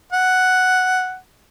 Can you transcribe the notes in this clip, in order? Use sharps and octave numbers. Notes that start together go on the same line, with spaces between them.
F#5